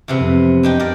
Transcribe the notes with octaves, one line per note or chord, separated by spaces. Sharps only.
E2 C3 B3
F2
D4 D#4 G4
G4 A#4 D5